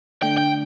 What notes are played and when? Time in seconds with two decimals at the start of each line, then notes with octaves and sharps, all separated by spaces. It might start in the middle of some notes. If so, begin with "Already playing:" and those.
0.22 D3 A3 D4 G5
0.38 G5